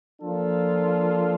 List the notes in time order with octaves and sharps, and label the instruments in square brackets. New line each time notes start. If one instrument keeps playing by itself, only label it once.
[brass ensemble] F3 A#3 D4 F4 A4